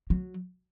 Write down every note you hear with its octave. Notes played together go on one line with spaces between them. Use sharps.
F#3